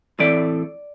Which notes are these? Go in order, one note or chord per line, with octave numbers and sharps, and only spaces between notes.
A2 E3 A3 C4 D5